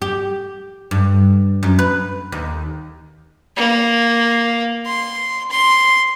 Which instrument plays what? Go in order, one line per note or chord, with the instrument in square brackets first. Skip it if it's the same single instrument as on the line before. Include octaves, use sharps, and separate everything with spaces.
[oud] G4
G2
F#2
B4
D#2
[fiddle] A#3
C6
C6